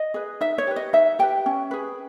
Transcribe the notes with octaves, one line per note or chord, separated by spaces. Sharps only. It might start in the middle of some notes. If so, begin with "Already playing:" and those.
Already playing: D#5
G#4 B4
D#4 E5
C#5
G4 B4
D#5
D#4 E5
G4 B4 G5
C#4
G#4 B4